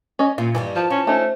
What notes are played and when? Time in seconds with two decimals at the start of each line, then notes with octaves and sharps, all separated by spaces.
0.19 C#4 D#5
0.38 A#2 F4
0.55 G2 D#3 E3 G3
0.75 F3 A5
0.91 F3 C#4
1.07 A3 C#4 D#4